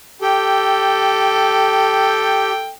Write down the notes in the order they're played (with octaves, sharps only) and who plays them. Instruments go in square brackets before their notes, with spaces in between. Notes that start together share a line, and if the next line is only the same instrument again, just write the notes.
[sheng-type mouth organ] G4 [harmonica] A4 G5